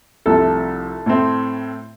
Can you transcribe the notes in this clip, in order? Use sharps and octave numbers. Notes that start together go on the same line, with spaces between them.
C2 C3 F3 A3 A4
A2 A3 C4